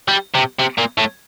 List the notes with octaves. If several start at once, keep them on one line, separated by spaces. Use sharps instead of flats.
G3
C3
C3
A#2
A2